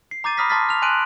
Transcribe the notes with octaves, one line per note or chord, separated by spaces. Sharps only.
C7
A#5 D6 G6 A6 D#7
A#5 B5 D#6 F6 A#6 B6
A5 C6 D6 F6 A6 B6
F6 F7
G#5 C6 F#6 D7 D#7 F#7